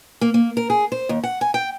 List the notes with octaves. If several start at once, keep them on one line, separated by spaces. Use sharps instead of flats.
A#3
A#3
A#4
G#4
C5
D#2
F#5
G#5
G5